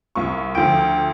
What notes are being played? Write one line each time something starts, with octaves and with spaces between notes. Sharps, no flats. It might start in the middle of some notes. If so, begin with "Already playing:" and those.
C2 F4 C#6
D2 F3 G5 D7